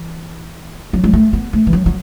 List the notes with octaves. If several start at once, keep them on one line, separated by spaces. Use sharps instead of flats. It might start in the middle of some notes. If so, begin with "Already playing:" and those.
Already playing: E3
F#3
G#3
A3
B3
A3
E3
F#3
F#3